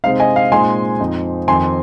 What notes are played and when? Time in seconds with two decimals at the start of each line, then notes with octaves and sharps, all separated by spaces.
0.04 C3 G#3 C4 D#4 F5
0.20 D#5 G#5
0.36 F5
0.52 A#2 G#3 C4 D#4 G#5 C6
1.00 F2 F3 C4 D#4
1.48 F2 D#3 C4 D#4 G#5 C6